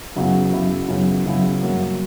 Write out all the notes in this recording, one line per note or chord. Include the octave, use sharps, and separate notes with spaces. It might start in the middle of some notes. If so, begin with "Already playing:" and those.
F#2 C#3 F#3 B3 E4
F#2 C#3 F#3 B3 E4
F#2 C#3 F#3 B3 E4
F#2 C#3 F#3 B3 E4
G2 F#3 A#3